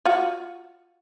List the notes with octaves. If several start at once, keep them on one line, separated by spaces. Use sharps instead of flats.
F4 F#4